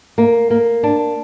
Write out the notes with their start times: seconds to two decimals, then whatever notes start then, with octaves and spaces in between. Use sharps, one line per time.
0.18 A#3
0.50 A#3
0.83 D4